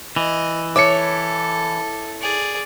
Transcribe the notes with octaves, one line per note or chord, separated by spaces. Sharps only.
E3 D#5
E4 A4 C#5 E5 D6 C#7
G#4 D5